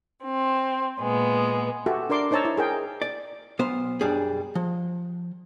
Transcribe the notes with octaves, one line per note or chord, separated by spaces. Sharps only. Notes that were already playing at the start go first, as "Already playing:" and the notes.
C4
A#2 G#3 B3
F#4 G4 A4 E5
D4 A#4 D5 C6 D6
D#4 C5 C#5 A5 A#5 E6
E4
G#4 A#4 G5
D5
B1 B3 C5 F5
B1 F#2 G3 D4 G#4
F3